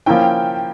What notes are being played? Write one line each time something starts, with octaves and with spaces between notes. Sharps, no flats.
F3 A#3 C#4 E4 G5